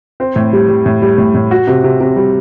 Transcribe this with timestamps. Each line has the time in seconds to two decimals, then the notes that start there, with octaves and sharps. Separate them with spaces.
0.20 C4
0.36 A2
0.53 G3
0.69 G3
0.86 A2
1.02 G3
1.18 A2
1.35 A2
1.51 F#4
1.67 C3
1.84 C3
2.00 C3
2.16 G3